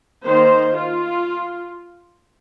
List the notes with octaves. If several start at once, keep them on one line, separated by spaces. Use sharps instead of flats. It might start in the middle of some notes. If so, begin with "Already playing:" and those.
D#3 A#3 C5
F4